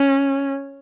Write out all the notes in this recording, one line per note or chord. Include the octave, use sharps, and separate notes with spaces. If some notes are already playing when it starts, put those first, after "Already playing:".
Already playing: C#4